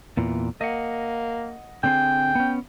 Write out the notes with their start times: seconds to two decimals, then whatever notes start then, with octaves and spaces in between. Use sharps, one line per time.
0.17 E2 A#2 E3
0.61 A#3 D#5 F#5
1.84 D3 C4 G#4 G5
2.35 B3 C#4